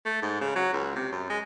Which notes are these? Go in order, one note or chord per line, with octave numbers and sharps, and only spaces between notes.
A3
G#2
C#3
F#3
C#2
C3
F#2
G#3